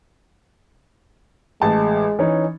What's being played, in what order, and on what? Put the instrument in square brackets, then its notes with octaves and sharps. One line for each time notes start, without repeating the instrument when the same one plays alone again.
[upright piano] A1 A5 [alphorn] G#3
[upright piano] E3 C#4 D#4